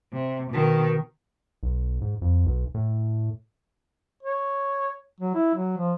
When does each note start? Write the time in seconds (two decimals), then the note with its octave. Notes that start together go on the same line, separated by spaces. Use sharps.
0.13 C3
0.51 B2 D#3
1.63 B1
2.02 G#2
2.22 F2
2.46 B1
2.74 A2
4.23 C#5
5.20 F#3
5.35 E4
5.55 F#3
5.78 F3